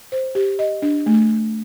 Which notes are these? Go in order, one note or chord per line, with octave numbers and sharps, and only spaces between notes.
C5
G4
D#5
D4
A3